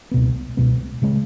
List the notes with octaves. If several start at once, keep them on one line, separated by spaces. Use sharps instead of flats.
C#2 B2 B3
C#2 B2 B3
C#3 E3 G#3